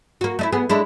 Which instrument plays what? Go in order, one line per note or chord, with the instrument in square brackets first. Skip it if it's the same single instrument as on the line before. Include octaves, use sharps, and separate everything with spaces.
[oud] A#3 F#4
A3 D#4 E4
B3 G#4
G#3 D4 E4